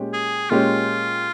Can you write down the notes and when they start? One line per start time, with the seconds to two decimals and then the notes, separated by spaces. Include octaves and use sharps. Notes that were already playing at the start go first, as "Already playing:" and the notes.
Already playing: A#2 G#3 C#4 G4
0.13 G#4
0.50 A#2 G#3 C#4 F4 G4